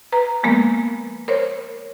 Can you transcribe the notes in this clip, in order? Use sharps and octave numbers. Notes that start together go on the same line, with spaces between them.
B4 A#5
F3 G#3 A#3 B3 A#4
A#4 C5 C#5